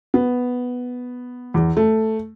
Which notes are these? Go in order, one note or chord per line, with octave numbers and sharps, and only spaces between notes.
B3
E2
A3